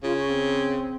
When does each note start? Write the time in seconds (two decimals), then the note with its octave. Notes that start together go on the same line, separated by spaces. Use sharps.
0.03 C#3 F4
0.17 C#4
0.30 C4